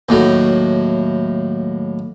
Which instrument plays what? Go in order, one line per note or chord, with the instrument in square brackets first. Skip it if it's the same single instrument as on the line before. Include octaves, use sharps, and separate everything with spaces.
[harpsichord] D#2 A2 F#3